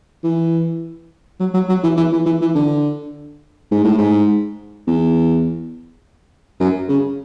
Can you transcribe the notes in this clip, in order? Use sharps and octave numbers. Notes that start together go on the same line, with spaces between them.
E3
F#3
F#3
F#3
E3
E3
E3
E3
E3
D3
G#2
A2
G#2
E2
F#2
C#3